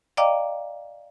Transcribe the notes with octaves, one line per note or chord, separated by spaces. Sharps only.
D5 D#5 F5 G5 A#5 D6